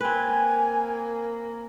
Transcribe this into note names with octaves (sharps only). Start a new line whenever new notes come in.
A#3 C4 B4 G#5